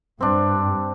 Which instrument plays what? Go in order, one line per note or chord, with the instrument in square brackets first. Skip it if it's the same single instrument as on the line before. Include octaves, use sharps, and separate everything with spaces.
[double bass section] G2 [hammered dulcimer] C4 D4